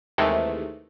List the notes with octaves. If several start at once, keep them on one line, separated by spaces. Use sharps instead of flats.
D#2 C3 D#3 E3 G#3 A3